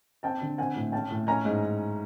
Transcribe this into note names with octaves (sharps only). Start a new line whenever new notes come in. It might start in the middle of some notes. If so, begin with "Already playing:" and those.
C4 G5 A5
D3
C4 F#5 G#5
A2
C#4 G5 A5
A2
C#4 G#5 A#5
G#2